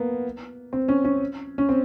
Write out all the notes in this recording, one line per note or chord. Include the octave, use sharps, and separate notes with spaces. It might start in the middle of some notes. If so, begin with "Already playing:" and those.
Already playing: A#3 B3
C4
C#4
C#4
C#4
C4